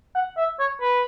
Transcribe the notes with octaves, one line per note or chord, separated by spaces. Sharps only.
F#5
E5
C#5
B4